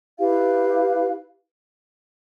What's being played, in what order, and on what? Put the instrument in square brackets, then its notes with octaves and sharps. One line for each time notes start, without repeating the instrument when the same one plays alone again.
[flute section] E4 G4 B4 F5